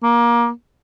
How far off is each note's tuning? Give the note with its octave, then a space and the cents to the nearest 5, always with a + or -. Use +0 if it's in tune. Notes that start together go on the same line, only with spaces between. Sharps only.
A#3 +20